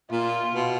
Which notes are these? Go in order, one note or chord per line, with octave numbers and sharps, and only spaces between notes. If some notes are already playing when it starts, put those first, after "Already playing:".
A#2 F4
B2